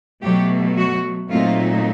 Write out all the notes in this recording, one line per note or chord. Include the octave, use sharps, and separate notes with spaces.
B2 F#3 A3 G4
F#4
A#2 F#3 A3 C4 D#4 F4